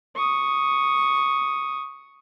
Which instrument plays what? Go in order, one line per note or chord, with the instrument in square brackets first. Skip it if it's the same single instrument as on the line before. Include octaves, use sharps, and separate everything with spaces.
[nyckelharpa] C#6 D#6